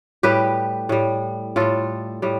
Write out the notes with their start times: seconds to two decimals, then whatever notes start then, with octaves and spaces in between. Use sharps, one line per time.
0.23 A2 G3 G4 B4
0.89 A2 G3
1.56 A2 G3 F4 A4
2.22 A2 G3